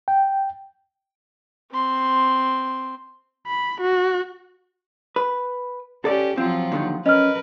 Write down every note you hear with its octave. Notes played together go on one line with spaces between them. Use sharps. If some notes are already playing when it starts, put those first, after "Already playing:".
G5
C4 C6
B5
F#4
B4
C#4 G4 A4 D5
F3 F#3 C4 F4
D#2 D3 D#3
C#4 A#4 B4 D#5 F6